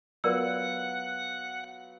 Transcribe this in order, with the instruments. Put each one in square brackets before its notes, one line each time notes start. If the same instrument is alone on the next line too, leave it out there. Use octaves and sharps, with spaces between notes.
[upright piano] F#3 B3 F4 [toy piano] A#4 D5 E6 [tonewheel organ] F#5